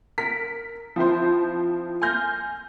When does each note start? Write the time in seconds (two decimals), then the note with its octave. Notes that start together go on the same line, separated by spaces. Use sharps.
0.18 A#4 B6
0.96 F3 C4 E4 C5
2.02 G#5 C6 F6 G6 A#6